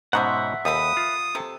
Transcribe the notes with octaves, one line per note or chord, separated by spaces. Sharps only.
G#2 B2 F#3 C#4 C5 E5 F#5
D#2 F3 A4 B5 D#6
F4
C3 A4